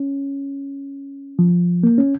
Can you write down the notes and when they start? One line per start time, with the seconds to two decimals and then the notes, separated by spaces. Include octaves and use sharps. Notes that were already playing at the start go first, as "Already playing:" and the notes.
Already playing: C#4
1.39 F3
1.83 A#3
1.98 C#4